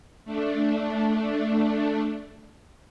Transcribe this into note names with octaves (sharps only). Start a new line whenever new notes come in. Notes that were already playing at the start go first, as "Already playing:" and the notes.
A3 D4